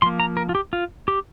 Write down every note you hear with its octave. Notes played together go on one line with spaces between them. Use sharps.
F3 A#3 C6
A#5
A#4
F4
G4
F4
G4